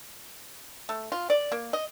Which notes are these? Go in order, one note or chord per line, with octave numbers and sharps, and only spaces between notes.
A3
F4
D5
A#3
D#5